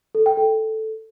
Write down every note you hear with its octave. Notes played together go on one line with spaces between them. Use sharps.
A4
G5
A4